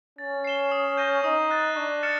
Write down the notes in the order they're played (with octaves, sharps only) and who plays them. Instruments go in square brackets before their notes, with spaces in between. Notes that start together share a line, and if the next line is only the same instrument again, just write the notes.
[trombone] C#4 [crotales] A6
[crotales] C7 E7 G7
D#6
G6 A#6 D#7 G7
[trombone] D#4 [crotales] D#6
[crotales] F#6 A6
[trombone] D4 [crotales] C#6
[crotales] F6 A6 C#7 E7